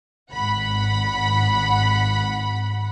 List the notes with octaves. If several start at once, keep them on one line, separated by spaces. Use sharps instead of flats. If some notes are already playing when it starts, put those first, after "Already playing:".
G#1 F#5 B5